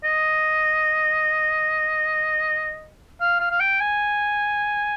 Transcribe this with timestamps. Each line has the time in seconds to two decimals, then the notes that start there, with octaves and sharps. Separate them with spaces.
0.04 D#5
3.21 F5
3.40 F5
3.51 F5
3.60 G5
3.80 G#5